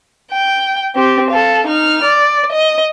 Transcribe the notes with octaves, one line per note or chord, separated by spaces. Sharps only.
G5
C4 G4
A4 F5
D#4 F6
D5
D#5